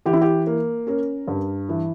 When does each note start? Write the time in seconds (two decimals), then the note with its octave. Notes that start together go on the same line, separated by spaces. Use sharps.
0.06 E3 G4
0.13 E4
0.21 G4
0.47 A#3
0.87 C#4 A#4
1.28 G2
1.69 E3